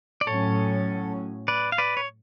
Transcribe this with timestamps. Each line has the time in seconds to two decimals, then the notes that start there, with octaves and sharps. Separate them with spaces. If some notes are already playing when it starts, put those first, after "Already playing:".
0.21 D5
0.27 A2 F#3 C#4 A4 C#5
1.48 B4 D5
1.72 F5
1.78 B4 D5
1.97 C#5